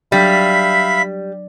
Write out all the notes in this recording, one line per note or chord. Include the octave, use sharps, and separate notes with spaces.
F#3 G3 D4 E5 F5 B5 B6